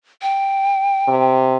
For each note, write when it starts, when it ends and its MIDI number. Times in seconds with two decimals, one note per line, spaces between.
0.22 1.34 79
1.08 1.57 48